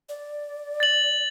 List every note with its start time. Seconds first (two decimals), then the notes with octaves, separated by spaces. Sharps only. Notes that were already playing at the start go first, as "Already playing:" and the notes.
0.09 D5
0.80 A6 F#7